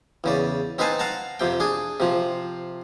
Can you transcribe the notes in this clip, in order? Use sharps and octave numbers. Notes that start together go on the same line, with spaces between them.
E2 C#3 D5
C4 D#4 B4 F5 G#5 A5
F5 F#5 A5 A#5
F2 C3 G5
D4 G#4
C3 F3